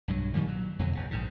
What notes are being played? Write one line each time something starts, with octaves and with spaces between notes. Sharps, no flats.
B1 G2 F#3
A#2 D#3 F3 G3
F#3
F2 B2 D3 F#3
B1 C#3
A#1 G#2 C#3